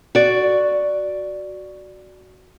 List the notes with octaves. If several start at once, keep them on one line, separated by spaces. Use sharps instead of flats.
F#4 D5